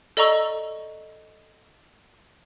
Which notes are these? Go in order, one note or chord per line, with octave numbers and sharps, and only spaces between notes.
A4 D5 D#5 A#5 C#6 E6